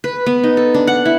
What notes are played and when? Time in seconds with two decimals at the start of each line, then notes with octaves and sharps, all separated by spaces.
0.04 B4
0.26 B3
0.43 D#4
0.57 A4
0.74 D4
0.87 F#5
1.05 E4